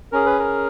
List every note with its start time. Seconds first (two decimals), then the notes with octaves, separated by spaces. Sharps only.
0.12 C#4 G#4 A#4
0.26 B4
0.39 A#4